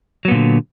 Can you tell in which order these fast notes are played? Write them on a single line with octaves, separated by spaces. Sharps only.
F#3 B3 A#2 D3